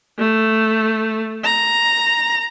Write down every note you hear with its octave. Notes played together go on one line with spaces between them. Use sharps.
A3
A#5